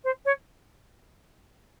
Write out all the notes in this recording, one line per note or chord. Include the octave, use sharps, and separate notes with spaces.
C5
C#5